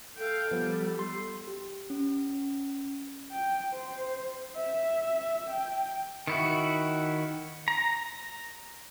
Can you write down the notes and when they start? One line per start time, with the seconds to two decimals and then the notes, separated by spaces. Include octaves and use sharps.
0.18 A4 F5 G5
0.51 F3 G3 B3
0.99 C6
1.47 G4
1.90 C#4
3.32 G5
3.73 C5
4.56 E5
5.50 G5
6.27 D#3 E4 F#4
7.68 A#5